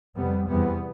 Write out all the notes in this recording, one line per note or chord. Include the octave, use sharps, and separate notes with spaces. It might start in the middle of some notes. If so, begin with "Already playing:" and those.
F2 C3 G3 B3
E2 C3 G3 B3